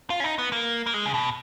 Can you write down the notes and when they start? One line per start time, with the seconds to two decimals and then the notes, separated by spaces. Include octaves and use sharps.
0.10 F4
0.20 C#4
0.24 D#4
0.38 B3
0.52 A#3
0.86 A#3
0.94 G#3
1.06 C#3
1.14 B2